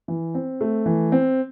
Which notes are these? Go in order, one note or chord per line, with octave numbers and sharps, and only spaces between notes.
E3
C4
A3
E3
C4